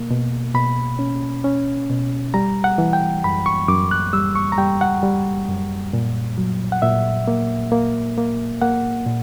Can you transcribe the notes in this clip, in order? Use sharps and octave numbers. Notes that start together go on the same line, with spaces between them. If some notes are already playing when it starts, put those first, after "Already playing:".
Already playing: B2 A#3
B2
B2 B5
C#4
C#4
B2
G3 A#5
F#5
E3
G5
F#2 B5
C#6
F#2 D6
F#6
G3 E6
C#6
A#5
G3 G5
F#5
G3
F#2
A#2
F#3
F#5
A#2 E5
A#3
A#3
A#3
A#3 F#5
A#2